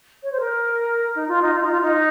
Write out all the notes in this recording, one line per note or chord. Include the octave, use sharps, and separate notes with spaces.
C#5
C5
A#4
D#4
F4
D#4
F4
D#4
F4
D#4